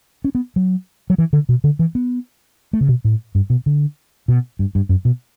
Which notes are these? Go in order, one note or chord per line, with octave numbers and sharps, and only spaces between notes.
C#4
B3
F#3
F#3
E3
D3
B2
D3
E3
B3
A3
C#3
B2
A2
G2
B2
D3
B2
G2
G2
F#2
B2